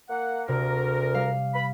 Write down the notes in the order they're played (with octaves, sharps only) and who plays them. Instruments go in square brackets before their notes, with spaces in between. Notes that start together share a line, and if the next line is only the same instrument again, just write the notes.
[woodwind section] A#3 F#5
[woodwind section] D2 A#4 [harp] C3
[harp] G3 F5
[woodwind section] B5